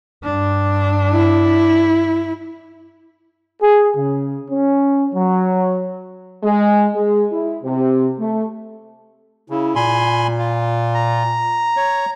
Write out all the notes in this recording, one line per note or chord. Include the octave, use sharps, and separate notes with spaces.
G2 D4
E4
G#4
C#3
C#4
F#3
G#3
G#3
E4
C3
A3
C#3 E4
A#2 G#5 B5 C6
F4
A#5
C#5